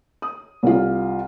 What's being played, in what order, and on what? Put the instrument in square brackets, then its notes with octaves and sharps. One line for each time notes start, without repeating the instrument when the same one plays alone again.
[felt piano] D#6
C2 F4